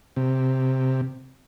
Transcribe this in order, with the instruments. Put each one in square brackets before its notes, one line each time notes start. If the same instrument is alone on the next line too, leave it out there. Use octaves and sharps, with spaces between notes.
[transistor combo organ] C3